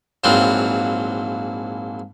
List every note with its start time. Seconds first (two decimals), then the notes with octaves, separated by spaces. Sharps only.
0.24 A#1 G#2 E3 F#3 C4 F4